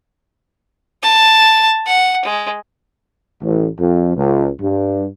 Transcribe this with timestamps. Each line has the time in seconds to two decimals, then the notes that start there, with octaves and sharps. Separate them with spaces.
1.03 A5
1.87 F#5
2.25 G#3
3.42 A1
3.79 F2
4.16 C#2
4.60 G2